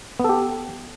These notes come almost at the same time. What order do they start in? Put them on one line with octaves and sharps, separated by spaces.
B3 A4 G4